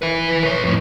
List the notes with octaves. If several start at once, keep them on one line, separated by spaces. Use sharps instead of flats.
E4 B4
B4 C#5
F2 A2